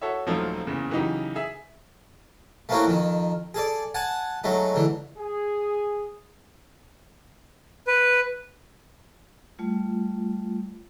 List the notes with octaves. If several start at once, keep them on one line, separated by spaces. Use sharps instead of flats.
F#4 A4 C#5 E5
D#1 F3 F#3 A3 D#4 F4
F#1 E2 C#3
C#3 E3 F#3 D#4 G4
G#4 E5
A3 A#3 C4 C#4 E4 F#4
F2 D#3
G#4 A4 D5
F#5 G#5 A5
F#3 G#3 A3 D#4
G#2 D3 E3
G#4
B4
G3 A3 F4